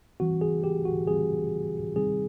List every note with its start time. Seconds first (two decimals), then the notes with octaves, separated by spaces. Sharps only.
0.20 E3 G3 C4 F#4
0.41 G#4
0.64 G4
0.85 F#4
1.08 E3 G3 C4 G#4
1.95 C3 D#3 G3 C4 D#4 G#4